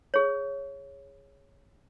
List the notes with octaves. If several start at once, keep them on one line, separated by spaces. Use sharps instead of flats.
G#4 C#5